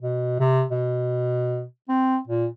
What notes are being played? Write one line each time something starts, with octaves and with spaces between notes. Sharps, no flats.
B2
C3
B2
C4
A#2